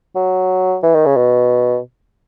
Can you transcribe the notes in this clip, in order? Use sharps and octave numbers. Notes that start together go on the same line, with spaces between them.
F#3
E3
D#3
C#3
B2